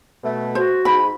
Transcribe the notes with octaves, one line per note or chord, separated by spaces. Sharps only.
B2 A3
F#4 C5
G#2 B5